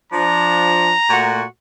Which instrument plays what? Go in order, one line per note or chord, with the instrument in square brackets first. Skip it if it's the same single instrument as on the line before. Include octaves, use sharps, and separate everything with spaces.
[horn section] F3 D4 [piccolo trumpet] A#5
[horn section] A#2 A3 F#4